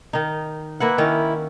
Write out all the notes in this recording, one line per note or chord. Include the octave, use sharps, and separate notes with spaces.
D#3 D#4
A#3 E4 B4 F#5
D#3 C#4 E4